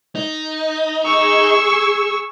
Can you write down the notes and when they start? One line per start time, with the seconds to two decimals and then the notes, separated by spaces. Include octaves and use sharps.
0.15 D#4
1.05 G#4 C#6 E6